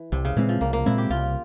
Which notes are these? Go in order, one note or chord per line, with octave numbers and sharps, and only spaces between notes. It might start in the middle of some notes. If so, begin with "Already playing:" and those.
Already playing: E3
C2 C3
C#3
A#2 E3 G#3 C4
F3
C2 A#3
A#3
A#2 G#3 C4 E4
G4
C2 F4